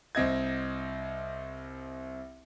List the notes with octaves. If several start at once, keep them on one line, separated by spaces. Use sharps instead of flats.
C2 C4 D#5 G#6